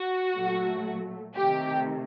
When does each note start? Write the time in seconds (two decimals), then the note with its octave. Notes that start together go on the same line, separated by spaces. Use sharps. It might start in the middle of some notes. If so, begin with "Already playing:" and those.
Already playing: F#4
0.35 A#2 F#3 A3
1.35 C3 D#3 A3 G4